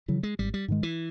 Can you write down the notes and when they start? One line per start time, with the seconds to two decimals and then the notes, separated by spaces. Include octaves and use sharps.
0.08 C#3 E3 F#3
0.23 G#3
0.39 G#1 G3
0.54 G3
0.68 G#2 D#3 G#3
0.83 E3